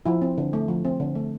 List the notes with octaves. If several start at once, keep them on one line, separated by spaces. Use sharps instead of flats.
F3 E4
C4
D3
A3
F3
C4
D3
A3